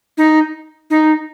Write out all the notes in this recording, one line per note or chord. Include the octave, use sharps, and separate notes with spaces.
D#4
D#4